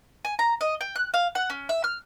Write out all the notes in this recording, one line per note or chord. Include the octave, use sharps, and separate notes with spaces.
G#5
A#5
D#5
G5
F#6
F5
F#5
C#4
E5
F6